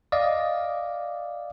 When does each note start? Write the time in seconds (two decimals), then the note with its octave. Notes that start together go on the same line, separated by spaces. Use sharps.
0.12 D5 D#5 F5